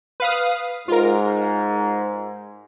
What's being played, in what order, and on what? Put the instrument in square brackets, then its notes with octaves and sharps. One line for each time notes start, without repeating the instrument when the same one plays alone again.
[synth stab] B4 F5 D#6
[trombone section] G#2 [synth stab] F4 A#4